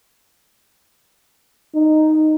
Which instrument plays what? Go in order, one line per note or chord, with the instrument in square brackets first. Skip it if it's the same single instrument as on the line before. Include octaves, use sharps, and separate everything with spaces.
[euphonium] D#4